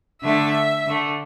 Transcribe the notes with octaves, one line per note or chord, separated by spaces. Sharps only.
D3 A3 E5
D3 A3